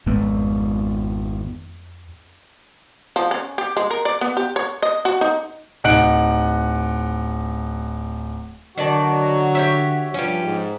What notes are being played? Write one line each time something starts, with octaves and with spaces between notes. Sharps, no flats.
G#1 F2 G#3 B3
F3
C#4
G4
G#3
A#4
D5
B3
G4
C#5
D#5
F#4
D#4
D1 D#4 F#5 F#6 D7 F#7
D3 D#3 F#3 F#4 D5 A5
G4 C#5 E5
G2 F3 C#4 G4
G#2